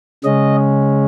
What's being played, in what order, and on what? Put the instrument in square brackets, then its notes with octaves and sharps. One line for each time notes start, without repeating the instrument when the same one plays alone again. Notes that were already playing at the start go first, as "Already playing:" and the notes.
[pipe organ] C#3 G#3 C#4 D#5